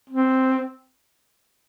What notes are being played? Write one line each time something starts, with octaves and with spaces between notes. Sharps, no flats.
C4